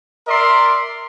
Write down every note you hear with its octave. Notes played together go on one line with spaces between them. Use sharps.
A#4 D5 E5 C6